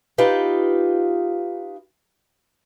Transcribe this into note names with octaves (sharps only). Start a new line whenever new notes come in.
D#4 F4 G4 B4